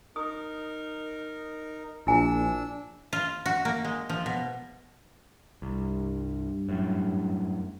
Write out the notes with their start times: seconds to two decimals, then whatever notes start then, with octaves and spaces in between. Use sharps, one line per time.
0.16 D#4 A#4 D#6
2.07 A#1 D4 E4 G#5 E6
3.13 F4
3.46 F#4
3.65 A#3
3.85 G#3
4.09 F3
4.26 B2
5.62 C2 G2
6.69 F#2 A2